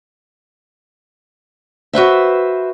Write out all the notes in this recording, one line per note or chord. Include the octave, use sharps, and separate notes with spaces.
F#4 B4 C5 E5